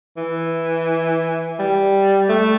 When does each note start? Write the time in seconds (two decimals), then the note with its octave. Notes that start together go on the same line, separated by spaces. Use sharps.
0.17 E3
1.59 G3
2.29 A3